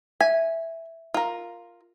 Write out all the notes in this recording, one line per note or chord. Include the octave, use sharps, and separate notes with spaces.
E5 G#5
F4 A#4